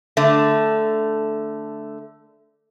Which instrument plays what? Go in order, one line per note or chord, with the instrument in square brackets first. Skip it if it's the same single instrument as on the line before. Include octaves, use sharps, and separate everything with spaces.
[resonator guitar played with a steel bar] D3 A3